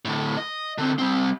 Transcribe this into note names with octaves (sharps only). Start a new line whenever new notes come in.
A2 D3
D#5
D3 C4
G3 C4